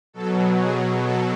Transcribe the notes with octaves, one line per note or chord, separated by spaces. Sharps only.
B2 F#3 A4
G#4
A4